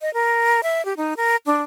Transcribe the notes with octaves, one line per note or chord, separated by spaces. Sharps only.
D#5
A#4
E5
G4
D#4
A#4
D4